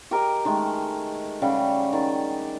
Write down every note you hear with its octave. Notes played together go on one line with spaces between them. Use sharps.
G4 A#4 D#5 G5
D#3 G#3 A3
C#3 G3 F#5 G5
D#3 D5